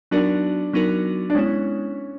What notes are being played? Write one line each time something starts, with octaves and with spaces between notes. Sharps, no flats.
F#3 B3 D4 D#4 F#4 A#4
F#3 B3 D#4 F#4 A#4
D4
G#3 B3 C#4 E4